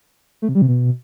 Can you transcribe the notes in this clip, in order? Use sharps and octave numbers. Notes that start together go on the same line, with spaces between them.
A3
C3
G3
C3
B2